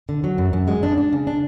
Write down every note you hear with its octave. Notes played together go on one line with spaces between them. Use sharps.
D3
F#3
F#2
F#2
G#3
D4
D4
C#3
D4